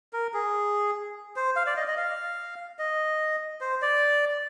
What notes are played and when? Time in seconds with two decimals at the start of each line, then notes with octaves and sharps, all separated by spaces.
0.13 A#4
0.34 G#4
1.36 C5
1.56 F5
1.67 D5
1.77 D#5
1.88 D#5
1.97 F5
2.79 D#5
3.61 C5
3.82 D5